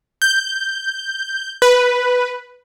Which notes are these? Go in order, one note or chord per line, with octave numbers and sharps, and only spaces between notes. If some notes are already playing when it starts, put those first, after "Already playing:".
G6
B4